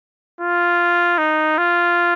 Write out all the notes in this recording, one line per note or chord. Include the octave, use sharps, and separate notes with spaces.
F4
D#4
F4